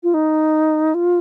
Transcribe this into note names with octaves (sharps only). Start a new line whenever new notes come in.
F4
D#4
F4